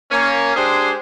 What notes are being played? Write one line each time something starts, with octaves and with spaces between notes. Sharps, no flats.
A#3 C#4
G#3 D4 G4 G#4 C5